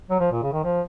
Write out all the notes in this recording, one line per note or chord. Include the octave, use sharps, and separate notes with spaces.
F#3
F3
A#2
C#3
D#3
F3